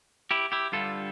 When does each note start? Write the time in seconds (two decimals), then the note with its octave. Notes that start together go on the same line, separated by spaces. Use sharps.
0.31 E4 G4
0.52 E4 G4
0.72 G2 D3 G3 F4 A4